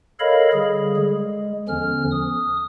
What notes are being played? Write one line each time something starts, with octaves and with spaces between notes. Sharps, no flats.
A4 A#4 C#5 D#5 F5 B5
D3 G3 G#4
G#3
E2 D3 F3 C#4 F6
D#6